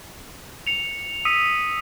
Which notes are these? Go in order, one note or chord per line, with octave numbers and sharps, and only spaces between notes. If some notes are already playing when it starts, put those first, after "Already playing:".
C#7 F7
D#6 E6 B6 C#7 D#7